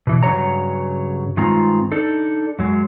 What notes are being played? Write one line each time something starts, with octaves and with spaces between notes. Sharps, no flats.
B2 E3
G2 C#3 F#3 C#5 A#5
G2 D#3 G#3 C4 F4 A#5
D4 D#4 A4
F#2 F#3 G#3